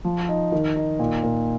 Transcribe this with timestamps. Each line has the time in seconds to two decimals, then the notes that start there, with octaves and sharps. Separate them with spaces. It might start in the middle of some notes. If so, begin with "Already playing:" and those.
0.04 F3
0.29 D#4
0.52 D#3
0.76 D#4
0.99 A#2
1.23 A#2